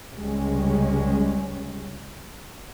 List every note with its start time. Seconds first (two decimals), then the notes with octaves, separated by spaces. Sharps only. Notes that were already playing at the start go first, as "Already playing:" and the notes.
0.16 C#2 C3 G3 G#3 C#4